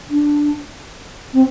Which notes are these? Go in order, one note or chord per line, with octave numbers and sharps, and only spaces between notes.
D4
C4